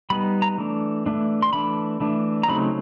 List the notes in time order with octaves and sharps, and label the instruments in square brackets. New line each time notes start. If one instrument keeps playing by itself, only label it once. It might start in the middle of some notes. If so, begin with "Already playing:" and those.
[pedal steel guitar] G3 B3 D#4 B5
A#5
E3 A3 D4
E3 A3 D4
C6
E3 A3 D4 B5
E3 A3 D4
A#5
C#3 F#3 A3 C4 D#4 B5